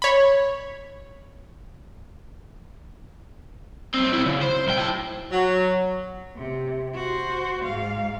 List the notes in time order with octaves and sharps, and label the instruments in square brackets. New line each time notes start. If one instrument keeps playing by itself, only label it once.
[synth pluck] C#5 B5
[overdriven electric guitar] F#2 C4
A#2 E4
C#3
C5
B1 G5
E4 A5
[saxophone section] F#3
[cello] C3
F#4 C5
G#2 F5